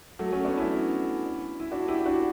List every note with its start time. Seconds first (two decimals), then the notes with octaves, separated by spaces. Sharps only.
0.19 F#3 A3
0.32 A3 C#4
0.45 B3 D4
0.57 C#4 E4
1.60 E4
1.72 D4 F#4
1.88 E4 G4
2.06 D4 F#4